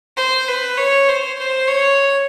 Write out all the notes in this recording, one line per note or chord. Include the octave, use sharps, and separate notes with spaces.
C5
B4
C#5
C5
C5
C#5